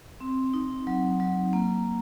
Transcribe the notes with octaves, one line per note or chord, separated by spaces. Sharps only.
C4
D#4
F#3
F#3
A#3